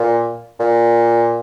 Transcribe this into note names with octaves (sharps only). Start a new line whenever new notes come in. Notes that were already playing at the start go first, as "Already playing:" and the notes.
Already playing: A#2
A#2